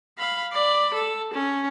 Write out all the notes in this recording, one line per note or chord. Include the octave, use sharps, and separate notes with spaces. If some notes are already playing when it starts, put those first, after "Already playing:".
F5 B5
D5 B5
A4
C#4